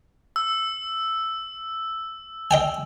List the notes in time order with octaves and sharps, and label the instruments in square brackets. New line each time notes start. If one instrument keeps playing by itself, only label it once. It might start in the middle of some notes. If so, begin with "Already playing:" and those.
[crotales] E6
[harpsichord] D#5 G5 G#5